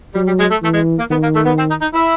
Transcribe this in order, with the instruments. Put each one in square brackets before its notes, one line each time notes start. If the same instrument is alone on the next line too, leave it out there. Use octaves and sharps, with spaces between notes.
[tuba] F#3 [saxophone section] G3
[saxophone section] G3
G#3
A3
[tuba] E3 [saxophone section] A3
[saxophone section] G#3
A#3
[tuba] D#3 [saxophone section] B3
[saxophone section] A#3
A3
B3
C4
D#4
D#4
E4